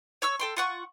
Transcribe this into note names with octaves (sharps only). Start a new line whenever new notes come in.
C#5 C#6 E6
A4 G5 C6
F4 F#5 C#6